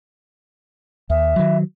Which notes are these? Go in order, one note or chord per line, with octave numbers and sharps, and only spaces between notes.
D#2 E5
D#3 F#3